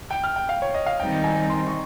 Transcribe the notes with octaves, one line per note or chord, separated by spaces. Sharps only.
G5
F6
G5
F5
C#5
D#5
F5
D#3 G3 C4 D#4 G5
G#5
C6
C#6